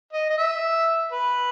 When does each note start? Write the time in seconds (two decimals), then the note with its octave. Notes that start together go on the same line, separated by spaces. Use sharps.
0.13 D#5
0.30 D#5
0.38 E5
1.12 B4